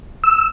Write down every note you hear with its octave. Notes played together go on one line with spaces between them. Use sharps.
E6